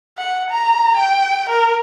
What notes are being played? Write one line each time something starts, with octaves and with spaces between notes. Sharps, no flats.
F#5
A#5
G5
A#4